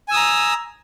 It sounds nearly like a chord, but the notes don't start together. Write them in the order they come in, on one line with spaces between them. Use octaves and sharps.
G#5 E6 D#6 A#5